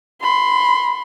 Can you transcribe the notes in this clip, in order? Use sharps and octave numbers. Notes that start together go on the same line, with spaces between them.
B5 C6